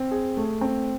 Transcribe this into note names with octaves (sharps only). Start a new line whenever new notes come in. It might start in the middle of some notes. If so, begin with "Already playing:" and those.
Already playing: C4
G#4
A3
C4